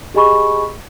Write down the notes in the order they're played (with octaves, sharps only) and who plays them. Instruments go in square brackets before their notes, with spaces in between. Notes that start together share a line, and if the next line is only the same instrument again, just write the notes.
[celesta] G4 G#4 D#5 G#5 B5 C#6